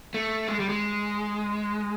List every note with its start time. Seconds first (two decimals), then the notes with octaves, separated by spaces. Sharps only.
0.14 A3
0.48 G#3
0.60 G3
0.69 G#3